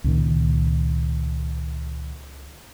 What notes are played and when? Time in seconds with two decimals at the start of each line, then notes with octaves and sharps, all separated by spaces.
0.04 C#2 A#2 D#3